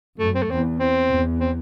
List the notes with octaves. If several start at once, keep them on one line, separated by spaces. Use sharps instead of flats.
F#2 A3
C4
A3
E2 C4
C4
E2
C4